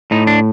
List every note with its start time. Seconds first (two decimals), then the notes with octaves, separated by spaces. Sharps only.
0.11 A2 D#4
0.27 D4